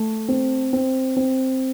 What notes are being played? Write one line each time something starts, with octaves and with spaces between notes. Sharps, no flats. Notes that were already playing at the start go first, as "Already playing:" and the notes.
Already playing: A3
C4
C4
C4